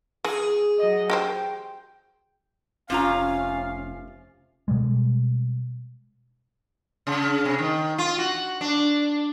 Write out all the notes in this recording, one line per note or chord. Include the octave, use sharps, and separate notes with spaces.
E3 G#4
F#3 D#5
F#4 G4 C5 G5
F1 C3 C#4 F4 F5 A#5
B2 G3 G#3
C#3
C3
D#3
F4
F#4
D4